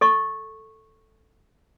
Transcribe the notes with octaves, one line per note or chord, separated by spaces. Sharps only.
A4 D#5 C#6